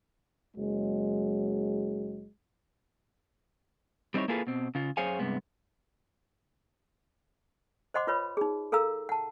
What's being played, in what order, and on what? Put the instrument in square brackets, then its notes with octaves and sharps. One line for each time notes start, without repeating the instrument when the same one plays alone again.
[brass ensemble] F#1 F#3 G#3
[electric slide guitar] G3 C4 D#4 E4 C#5
A#3 E4 F4 G#4 A4 B4
B2 C4
C#3 F4
F#2 G#4 C5 C#5 F5 G#5
G2 C3 G#3 B3
[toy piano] C5 D#5 F#5 C6 D6
F4 B4 C#5 B5
D#4 G#4
A4 A#4 F5 A#5 E6
F#5 A5